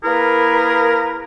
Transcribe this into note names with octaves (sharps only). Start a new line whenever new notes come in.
A#3 E4 G#4 A#4 B4